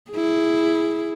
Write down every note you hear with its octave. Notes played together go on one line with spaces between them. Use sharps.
E4 G#4